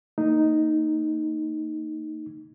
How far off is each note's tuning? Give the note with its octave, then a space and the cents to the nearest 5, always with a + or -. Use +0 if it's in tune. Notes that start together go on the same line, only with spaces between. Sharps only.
A#3 -30 D#4 +0